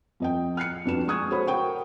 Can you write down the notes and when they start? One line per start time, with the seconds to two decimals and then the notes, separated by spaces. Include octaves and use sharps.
0.20 F2 D#5 G5
0.57 F6 F#6 C7 C#7
0.85 F2 B3 D4 F#4 E7
1.08 G#3 C#6 D#6 F#6 G#6
1.31 F#4 A4 C5 C#5 B5
1.47 F#4 A#4 F#5 G5 C#6